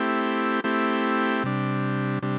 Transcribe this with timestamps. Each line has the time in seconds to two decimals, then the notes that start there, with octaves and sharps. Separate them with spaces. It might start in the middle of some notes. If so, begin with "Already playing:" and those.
Already playing: A3 C4 E4 G4
0.64 A3 C4 E4 G4
1.44 C3 G3 D4
2.22 C3 G3 D4